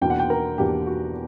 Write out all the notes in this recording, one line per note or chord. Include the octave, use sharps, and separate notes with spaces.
E2 B2 A#3 D4 G5
F#5
G5
A#4
E2 B2 A#3 D4 G4
F#4